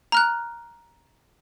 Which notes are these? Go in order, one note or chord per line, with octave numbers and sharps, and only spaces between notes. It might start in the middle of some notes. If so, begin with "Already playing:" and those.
A#5 F6 F#6